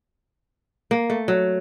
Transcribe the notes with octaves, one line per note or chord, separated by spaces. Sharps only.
A#3
A3
F#3